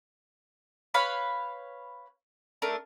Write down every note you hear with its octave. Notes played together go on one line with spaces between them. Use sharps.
B4 C#5 F5 B5
A3 D4 A#4